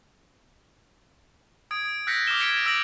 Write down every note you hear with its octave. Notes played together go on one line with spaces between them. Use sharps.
D#6 G#6 D7
D#6
E6 F#6 G6 A#6 B6 C#7
D6 D#6 F6 E7 G7
G#6 B6 C#7 D7 E7
E6 G#6 A#6 D7 F7 F#7